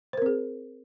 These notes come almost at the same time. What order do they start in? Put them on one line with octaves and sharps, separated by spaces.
C5 A#4 C4 G#4